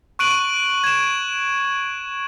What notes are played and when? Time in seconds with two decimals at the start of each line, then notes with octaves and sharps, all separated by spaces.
0.19 C#6 F#6 D7 D#7 F#7
0.84 G#6 E7